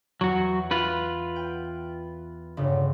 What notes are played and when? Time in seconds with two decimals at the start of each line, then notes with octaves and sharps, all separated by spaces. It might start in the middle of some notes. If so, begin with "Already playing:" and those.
0.21 E2 F#3 F#4
0.71 F4 B4
1.36 G5
2.57 G1 G2 C#3